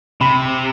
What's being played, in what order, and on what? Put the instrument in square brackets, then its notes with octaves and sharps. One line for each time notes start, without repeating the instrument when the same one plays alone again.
[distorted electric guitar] C3 [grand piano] B5